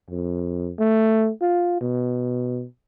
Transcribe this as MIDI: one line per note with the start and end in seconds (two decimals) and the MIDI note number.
0.10 0.71 41
0.79 1.30 57
1.42 1.77 65
1.81 2.65 47